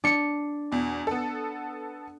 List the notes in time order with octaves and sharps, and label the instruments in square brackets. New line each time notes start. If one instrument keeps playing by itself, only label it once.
[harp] D4 C#7
[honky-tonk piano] E2 B2
B3 A4